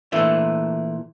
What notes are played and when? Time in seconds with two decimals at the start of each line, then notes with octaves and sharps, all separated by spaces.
0.12 A#2 E3 A3 D4